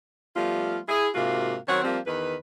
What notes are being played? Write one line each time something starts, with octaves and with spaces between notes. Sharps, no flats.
F3 G3 A3 B3 F4
E4 G#4
G#2 C3 A#3 F4 F#4
D#3 F#3 C4 C#5 F#5
F3 G3 A#3 C4
E2 D#3 B4